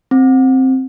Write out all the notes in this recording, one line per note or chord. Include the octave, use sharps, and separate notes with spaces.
C4